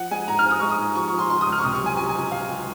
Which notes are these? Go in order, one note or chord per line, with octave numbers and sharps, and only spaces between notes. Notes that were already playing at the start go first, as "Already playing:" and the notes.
Already playing: F3 F#5
G#3 G#5
G#2 A#5
F6
C4
D#6
G#3 C#6
D#6
G#2
F3 C#6
C#6
F3
C6
C#2 C6
D#6
C#2
F6
C#6
C3 D#6
C#6
F#3 G#5
C#2 G#5
G#5
C#2
C#2 F5
C#2